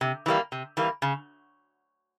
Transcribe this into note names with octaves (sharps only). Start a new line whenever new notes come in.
C3
E3 G3 A#3
C3
E3 G3 A#3
C#3